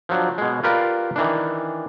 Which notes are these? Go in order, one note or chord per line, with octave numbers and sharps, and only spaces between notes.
F3 F#3 D4
B2 G#3
F4 G4 A#4 B4 D5 F5
D#3 E3 D4